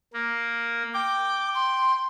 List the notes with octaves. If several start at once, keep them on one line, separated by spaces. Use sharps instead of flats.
A#3
G5 D6
C6